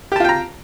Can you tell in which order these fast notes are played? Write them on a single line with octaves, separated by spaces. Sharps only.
G4 A5 F4 G5 A#5